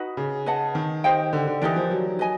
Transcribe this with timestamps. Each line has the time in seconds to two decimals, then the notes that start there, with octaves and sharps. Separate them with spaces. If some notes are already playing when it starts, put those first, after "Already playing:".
Already playing: D#4 F#4 B4 D#5
0.17 C#3
0.46 B4 D#5 F#5 A5
0.75 D#3
1.04 G4 C5 D#5 G5
1.33 D3
1.47 D3
1.62 E3 D#4 G4 A#4 D5
1.76 F3
1.91 F#3
2.19 B4 D#5 G#5